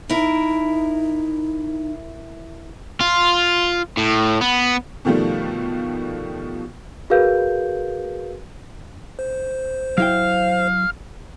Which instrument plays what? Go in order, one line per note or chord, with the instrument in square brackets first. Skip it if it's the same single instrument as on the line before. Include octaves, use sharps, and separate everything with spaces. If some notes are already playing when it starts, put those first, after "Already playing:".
[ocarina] D#4 [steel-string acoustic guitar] E4 A#4
[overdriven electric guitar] F4
A2
B3
[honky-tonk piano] B2 D#3 F3 G3 A3
[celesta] F#4 G#4 A#4 B4 F5 G6
[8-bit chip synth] C5
[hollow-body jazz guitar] F#3 E4 G5 [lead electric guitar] F5